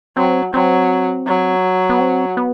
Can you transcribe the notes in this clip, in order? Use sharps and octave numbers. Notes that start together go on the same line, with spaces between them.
F#3 C4
F#3 C4
F#3
B3
C4
B3